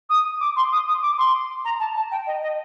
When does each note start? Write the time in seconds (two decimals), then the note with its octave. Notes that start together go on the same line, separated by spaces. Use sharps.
0.10 D#6
0.40 D6
0.56 C6
0.72 D#6
0.87 D#6
1.02 D6
1.18 C6
1.65 A#5
1.80 A5
1.96 A5
2.11 G5
2.27 D#5
2.42 D#5